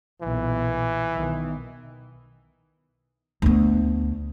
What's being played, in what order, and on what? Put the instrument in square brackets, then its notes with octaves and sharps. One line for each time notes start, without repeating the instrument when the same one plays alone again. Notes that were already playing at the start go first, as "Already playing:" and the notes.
[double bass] B1 A#2 [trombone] E3
[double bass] B1 D#3
[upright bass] D2 B3